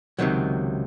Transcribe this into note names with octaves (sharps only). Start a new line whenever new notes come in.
C#2 C3 D#3 F#3